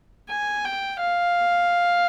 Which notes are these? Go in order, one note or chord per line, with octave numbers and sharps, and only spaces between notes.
G#5
G5
F5